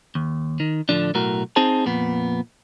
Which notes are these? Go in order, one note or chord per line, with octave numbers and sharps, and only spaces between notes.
D#2
D#3
A2 D3 F3 D4
B1 A2 F#4 A#4
C4 D#4 G#4 C5 A5
F2 A#2 B3